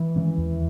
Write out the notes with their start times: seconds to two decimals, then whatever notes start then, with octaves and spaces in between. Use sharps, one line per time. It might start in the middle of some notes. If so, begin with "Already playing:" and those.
Already playing: E3
0.16 D#3 G#3 C#4
0.37 E2